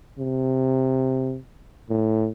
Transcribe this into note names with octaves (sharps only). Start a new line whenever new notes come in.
C3
A2